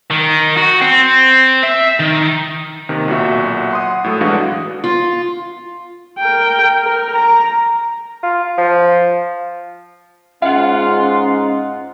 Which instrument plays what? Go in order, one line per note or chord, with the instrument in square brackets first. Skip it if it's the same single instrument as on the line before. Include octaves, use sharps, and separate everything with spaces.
[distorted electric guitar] D#3
F#4
C4
E5
D#3
[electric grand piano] D#2 C3 D#3
B1 A#2 F#4 E5
F#5 C6 D#6
A2 F#3 A4
G1 E3 G#3 D4 F#4 F5
[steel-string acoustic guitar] F4
[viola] A#4 G5
A#4
A#5
[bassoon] F4
F3
[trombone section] G#2 G#3 [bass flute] C#4 [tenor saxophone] F4 [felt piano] F5 F#5